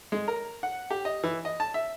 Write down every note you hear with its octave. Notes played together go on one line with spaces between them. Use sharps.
G#3
A#4
F#5
G4
D#5
E3
D#5
A5
E5